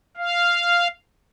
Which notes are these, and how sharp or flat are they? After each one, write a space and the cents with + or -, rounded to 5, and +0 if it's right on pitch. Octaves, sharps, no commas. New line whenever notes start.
F5 -5